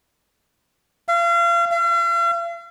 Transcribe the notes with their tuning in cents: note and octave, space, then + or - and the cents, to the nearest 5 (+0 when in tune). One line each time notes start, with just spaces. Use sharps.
F5 -35
F5 -45